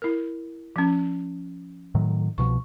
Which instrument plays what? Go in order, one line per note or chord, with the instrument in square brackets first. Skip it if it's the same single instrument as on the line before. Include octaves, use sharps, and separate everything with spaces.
[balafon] E4 A#4
F3 C#4
[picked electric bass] A2 D#3 F#3
[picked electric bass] C2 B2 F3 [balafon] C#6